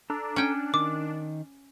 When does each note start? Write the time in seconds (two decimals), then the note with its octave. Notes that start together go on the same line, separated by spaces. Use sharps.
0.10 D4 A4 A#5 E6
0.36 C#4 G5
0.74 D#3 D6